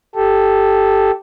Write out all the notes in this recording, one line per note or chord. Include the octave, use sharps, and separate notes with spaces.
G4 A4